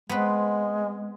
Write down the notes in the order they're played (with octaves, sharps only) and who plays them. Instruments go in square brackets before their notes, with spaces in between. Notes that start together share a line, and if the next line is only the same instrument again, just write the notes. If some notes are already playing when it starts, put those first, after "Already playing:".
[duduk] G#3 [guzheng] B3 C4 B4